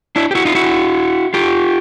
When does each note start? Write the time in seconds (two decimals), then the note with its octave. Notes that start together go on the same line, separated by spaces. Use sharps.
0.16 D4 E4
0.31 G4
0.35 E4 F#4
0.45 D#4 F4
0.55 E4 F#4
1.34 F4 G4